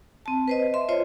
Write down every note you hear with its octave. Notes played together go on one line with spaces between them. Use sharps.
C4 A5
B4 C5 D#5
E5 C6
F4 C5 C#5 D#5